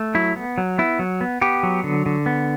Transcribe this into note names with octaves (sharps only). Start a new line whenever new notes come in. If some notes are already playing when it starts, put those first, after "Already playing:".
Already playing: A3
F#3 E4
B3
F#3
B3 E4
F#3
B3
B3 G4
F#3
D3
D3
B3